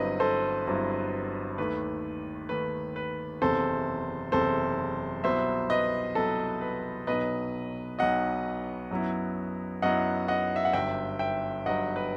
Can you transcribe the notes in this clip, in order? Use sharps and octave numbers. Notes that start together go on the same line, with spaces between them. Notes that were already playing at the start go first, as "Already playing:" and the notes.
Already playing: G1 G2 F#3 C4 E4 B4 D#5
A4 C5
G1 G2 F#3 C4 E4
D#2 D#3 A3 B4
D#2 D#3 A3 B4
B4
F#1 E2 C3 A4 C5
F#1 E2 C3 A4 C5
C2 B2 F#3 C5 E5
B4 D#5
C2 B2 F#3 A4
B4
B1 B2 F#3 B4 D#5
B1 B2 F#3 D#5 F#5
F#2 F#3 B3 E4
F#2 F#3 B3 E4 D#5 F#5
D#5 F#5
E5
F#5
G1 G2 F#3 E5 G5
E5 G5
G1 G2 F#3 D#5 F#5
B4